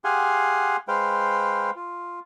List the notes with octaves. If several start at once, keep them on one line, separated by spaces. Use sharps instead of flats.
G4 G#4 F5 F#5 G#5 C6
G#3 B4 C5 F5 G5
F4